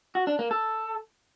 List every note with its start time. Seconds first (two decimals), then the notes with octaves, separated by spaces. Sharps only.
0.15 F#4
0.27 D4
0.39 A#3
0.51 A4